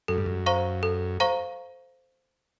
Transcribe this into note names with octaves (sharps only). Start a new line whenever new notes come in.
F#2 A4
G2
F#2
C5 F5 A#5 C#6
A4
C5 F5 A#5 C#6